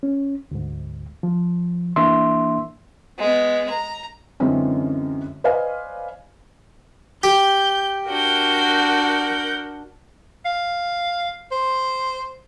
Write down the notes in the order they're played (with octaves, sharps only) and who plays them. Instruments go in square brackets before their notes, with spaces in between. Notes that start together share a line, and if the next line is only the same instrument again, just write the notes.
[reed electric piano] C#4
D2 G#2
F3
E3 A#3 D4 E5 C6 E6
[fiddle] G#3 B3
A#5
[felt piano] F#2 D3 E3 G#3 C4 C#4
B4 C5 D5 D#5 F5 G#5
[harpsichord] G4 [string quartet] G6
[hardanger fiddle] D4 F#4 [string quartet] A#4 F#5 G6
[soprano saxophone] F5
C5